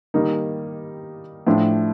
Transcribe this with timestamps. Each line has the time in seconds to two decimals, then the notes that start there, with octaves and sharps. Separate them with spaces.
0.14 D#3 G3 A#3 D#4
1.47 A2 F3 A3 D4